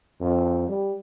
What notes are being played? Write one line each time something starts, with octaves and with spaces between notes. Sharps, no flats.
F2
G3